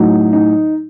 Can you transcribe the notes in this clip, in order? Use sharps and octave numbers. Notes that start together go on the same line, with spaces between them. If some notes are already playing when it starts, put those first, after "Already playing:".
Already playing: A2 F#3 D#4
D#4